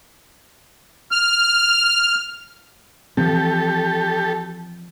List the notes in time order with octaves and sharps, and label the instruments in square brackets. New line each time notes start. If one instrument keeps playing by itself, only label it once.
[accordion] F6
[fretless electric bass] E3 F3 C4 [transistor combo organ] G4 A4